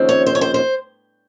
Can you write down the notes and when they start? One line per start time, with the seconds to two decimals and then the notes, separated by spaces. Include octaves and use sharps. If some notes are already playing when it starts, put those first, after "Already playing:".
Already playing: D#2 C#3 F3 C4
0.09 C#5
0.26 C5
0.35 C#5
0.41 C5
0.54 C5